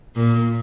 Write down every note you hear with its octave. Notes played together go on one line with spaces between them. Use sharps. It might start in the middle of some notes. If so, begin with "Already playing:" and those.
A#2